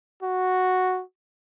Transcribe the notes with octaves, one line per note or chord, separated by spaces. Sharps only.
F#4